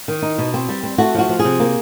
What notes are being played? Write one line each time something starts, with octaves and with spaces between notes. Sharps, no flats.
D#3
D#4
B2
C4
G3
C4
A3 F#4
F3 F#4
F3
G#4
C3
A#3